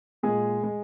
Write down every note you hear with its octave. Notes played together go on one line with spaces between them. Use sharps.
A#2 G#3 G#4
G#3